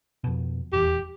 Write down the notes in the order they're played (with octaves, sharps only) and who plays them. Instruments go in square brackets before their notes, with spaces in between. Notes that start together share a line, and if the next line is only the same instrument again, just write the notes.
[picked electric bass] F2 B2
[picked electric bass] D#1 E2 [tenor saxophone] G4